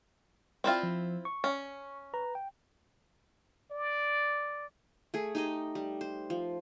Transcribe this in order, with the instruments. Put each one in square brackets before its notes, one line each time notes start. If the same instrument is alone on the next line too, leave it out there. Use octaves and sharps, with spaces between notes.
[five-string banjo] C4 E4 F4 [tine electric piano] D5
[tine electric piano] F3
C#6
[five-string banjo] C#4
[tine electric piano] B4 A#5
G5
[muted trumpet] D5
[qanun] A3 G#4
D#4 G4 D#5
G3
C5
F3